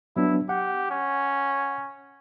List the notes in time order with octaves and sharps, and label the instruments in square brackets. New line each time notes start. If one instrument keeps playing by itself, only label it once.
[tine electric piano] F#3 B3 D4 [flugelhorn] E4
[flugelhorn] G4 [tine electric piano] F#5
[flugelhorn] C#4